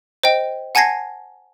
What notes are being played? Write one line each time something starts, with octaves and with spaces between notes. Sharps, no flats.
C5 D#5 G5
F#5 G#5 A5 G#6 A#6 C7